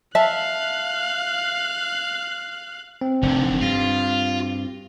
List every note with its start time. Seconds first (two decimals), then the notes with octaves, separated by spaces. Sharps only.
0.15 E5 F5 A5 F#6
3.01 C4
3.23 F1 D3 D#3
3.61 G2 F4